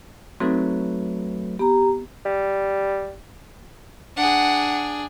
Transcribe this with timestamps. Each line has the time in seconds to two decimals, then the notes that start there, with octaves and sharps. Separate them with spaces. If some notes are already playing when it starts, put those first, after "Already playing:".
0.40 F#3 A3 C4 D#4 B4
1.59 B3 G4 A#5
2.25 G3
4.17 D4 G#4 F#5